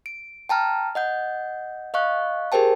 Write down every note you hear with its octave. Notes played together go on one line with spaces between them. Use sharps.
D7
G5 A5 A#5 F6
D#5 F#5 G6
D#5 F5 C#6 F#6
G4 G#4 A#4 C5 G5 A5